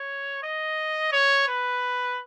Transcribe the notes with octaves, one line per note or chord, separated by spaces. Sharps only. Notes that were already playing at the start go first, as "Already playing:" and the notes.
Already playing: C#5
D#5
C#5
B4